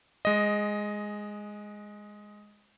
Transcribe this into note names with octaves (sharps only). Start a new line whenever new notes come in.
G#3 D#5